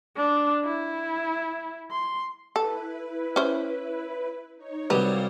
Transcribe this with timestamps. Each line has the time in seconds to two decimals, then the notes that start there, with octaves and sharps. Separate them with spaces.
0.17 D4
0.65 E4
1.91 C6
2.56 E4 A4 B4
3.36 C#4 C5 E5
4.56 D#4 C#5
4.90 C2 F#3 G3 B4 C#5 D5 F5